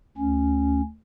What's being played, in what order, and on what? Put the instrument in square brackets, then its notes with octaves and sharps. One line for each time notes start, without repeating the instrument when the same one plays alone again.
[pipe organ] D2 C#4